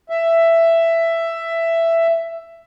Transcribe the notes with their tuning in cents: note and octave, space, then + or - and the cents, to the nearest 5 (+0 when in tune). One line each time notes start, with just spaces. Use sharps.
E5 +10